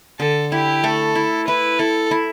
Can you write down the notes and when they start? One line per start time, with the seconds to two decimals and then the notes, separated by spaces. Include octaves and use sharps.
0.20 D3 A4
0.52 E4 G4
0.84 A3 A4
1.15 E4
1.47 E4 B4
1.79 E4 A4
2.11 E4